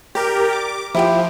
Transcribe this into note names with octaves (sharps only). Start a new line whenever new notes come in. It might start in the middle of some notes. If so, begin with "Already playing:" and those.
G4 A#4 D5
D6
F3 E4 G4 G5